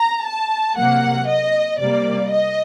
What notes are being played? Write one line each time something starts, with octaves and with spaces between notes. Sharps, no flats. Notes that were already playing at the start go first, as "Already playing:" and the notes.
Already playing: A#5
A5
C3 F#3 A#3 F#5
D#5
C3 G3 A#3 D5
D#5